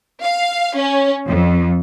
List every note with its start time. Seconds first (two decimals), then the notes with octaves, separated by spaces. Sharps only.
0.23 F5
0.76 C#4
1.27 F2